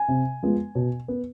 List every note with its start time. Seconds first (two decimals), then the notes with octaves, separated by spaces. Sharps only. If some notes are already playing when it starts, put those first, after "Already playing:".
Already playing: G#5
0.08 C3
0.43 F3 G#3 B3
0.75 B2
1.08 B3